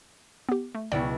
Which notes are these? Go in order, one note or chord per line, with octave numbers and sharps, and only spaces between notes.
B3 G4
A3
C#2 B2 E4 D5 G5